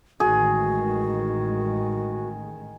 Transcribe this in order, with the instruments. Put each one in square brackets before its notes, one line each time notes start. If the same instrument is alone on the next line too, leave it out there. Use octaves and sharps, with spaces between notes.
[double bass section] A1 D#3 G#3 [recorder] F#4 [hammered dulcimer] G#4